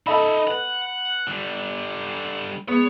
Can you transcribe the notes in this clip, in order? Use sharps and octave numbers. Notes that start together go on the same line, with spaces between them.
D#4 A4 D#5 E5 B5
B4 F#5
D3 G3
G#3 B3 C#5